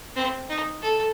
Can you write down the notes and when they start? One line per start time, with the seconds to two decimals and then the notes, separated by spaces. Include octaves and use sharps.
0.16 C4
0.49 D#4
0.82 A4